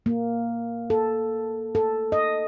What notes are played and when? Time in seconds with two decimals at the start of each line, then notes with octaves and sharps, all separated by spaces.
0.06 A#3
0.90 A4
1.75 A4
2.12 D#5